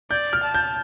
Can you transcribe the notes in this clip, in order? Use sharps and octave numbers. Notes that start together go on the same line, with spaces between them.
D5 G6
F6
A5
G6